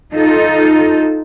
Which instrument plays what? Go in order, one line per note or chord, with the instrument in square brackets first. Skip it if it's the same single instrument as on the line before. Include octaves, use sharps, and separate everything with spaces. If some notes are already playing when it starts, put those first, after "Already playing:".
[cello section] D#4 F4 A4